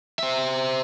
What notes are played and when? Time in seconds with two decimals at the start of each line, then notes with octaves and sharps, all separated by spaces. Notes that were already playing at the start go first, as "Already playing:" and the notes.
0.19 C5 E5